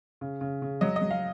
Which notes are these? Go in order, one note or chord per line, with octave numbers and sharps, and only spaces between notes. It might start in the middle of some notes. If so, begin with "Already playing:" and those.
C#3
C#3
C#3
F#3 D#5
D#5
F#3
F5